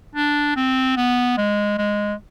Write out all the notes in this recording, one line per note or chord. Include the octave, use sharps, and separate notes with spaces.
D4
C4
B3
G#3
G#3